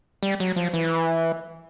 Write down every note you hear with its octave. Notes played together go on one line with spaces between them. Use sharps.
G3
F#3
F3
E3